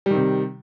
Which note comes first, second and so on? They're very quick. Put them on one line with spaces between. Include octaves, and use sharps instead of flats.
G3 D#3 C3